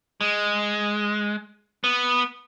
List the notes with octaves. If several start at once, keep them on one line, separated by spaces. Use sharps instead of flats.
G#3
B3